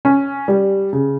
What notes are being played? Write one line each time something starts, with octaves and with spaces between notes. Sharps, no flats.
C#4
G3
C#3